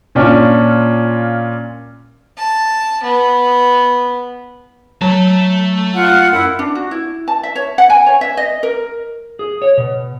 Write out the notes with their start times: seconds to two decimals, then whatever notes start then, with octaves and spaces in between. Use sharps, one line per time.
0.15 A#2 C#4 D4 F4
2.37 A5
3.03 B3
5.02 F#3 A3 A5
5.94 F4 F#5
6.32 F#2 E4 F#5
6.59 D4
6.75 F#4
6.91 E4
7.28 A5
7.43 E5
7.56 C#5
7.78 F#5
7.90 G#5
8.06 C#5
8.21 E5
8.37 D#5
8.63 A#4
9.39 G#4
9.62 C#5
9.77 B2